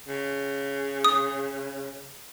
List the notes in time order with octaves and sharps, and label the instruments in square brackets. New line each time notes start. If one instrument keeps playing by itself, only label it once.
[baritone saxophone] C#3
[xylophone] D#6